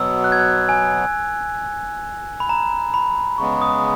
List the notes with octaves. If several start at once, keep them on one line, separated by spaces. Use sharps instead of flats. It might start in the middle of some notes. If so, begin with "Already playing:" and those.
Already playing: B2 F#3 B3 E6
F#6
G#6
F#6
G#5
B5
A#5
B5
C#3 G#3 B3 C#6
D#6